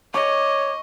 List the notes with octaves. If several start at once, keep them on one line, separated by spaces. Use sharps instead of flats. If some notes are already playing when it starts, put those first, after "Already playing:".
C#5 D#5 C#6 D6